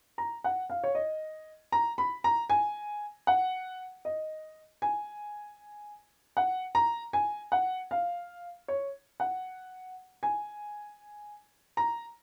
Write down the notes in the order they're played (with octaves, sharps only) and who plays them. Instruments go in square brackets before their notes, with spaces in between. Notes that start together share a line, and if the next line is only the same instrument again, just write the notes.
[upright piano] A#5
F#5
F5
C#5
D#5
A#5
B5
A#5
G#5
F#5
D#5
G#5
F#5
A#5
G#5
F#5
F5
C#5
F#5
G#5
A#5